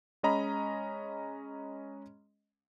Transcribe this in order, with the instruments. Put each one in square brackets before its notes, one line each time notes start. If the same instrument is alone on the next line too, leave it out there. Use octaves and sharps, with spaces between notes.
[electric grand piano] G#3 C#4 D#5 A#5 B5